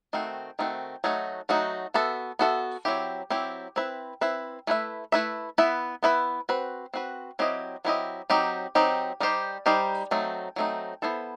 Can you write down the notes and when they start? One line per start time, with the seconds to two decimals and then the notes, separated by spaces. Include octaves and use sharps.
0.13 D#3 A3 C4 F#4
0.59 D#3 A3 C4 F#4
1.04 F#3 A3 D#4 F#4
1.49 F#3 A3 D#4 F#4
1.94 B3 F#4 A4 E5
2.39 B3 F#4 A4 E5
2.85 F#3 C4 E4 G4
3.30 F#3 C4 E4 G4
3.76 C4 E4 B4 E5
4.21 C4 E4 B4 E5
4.67 A3 E4 B4 E5
5.12 A3 E4 B4 E5
5.58 B3 E4 B4 E5
6.03 B3 E4 B4 E5
6.49 C4 F#4 B4
6.94 C4 F#4 B4
7.39 F#3 C4 E4 G4 D#5
7.85 F#3 C4 E4 G4 D#5
8.30 F#3 C4 D#4 G4
8.75 F#3 C4 D#4 G4
9.20 G3 D#4 G4 C5
9.66 G3 D#4 G4 C5
10.11 F#3 A3 C4 D#4
10.56 F#3 A3 C4 D#4
11.02 B3 E4 A4 C5